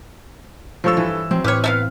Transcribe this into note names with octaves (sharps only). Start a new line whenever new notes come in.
G2 F3 A4 C#5 E6
E3
F3 F#3 C4
A2 G4 B4 C#5 F6
A3 B3 F5